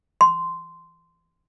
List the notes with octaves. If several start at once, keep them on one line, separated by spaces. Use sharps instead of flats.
C6